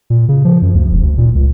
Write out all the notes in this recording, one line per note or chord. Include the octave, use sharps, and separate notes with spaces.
A#2
C#3
F3
F#2
D2
E1
D2
A#2
C#2